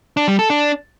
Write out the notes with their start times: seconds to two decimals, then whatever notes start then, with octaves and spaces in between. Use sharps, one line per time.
0.17 D4
0.28 G3
0.39 A4
0.50 D4